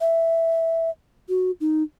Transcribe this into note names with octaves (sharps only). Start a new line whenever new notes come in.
E5
F#4
D#4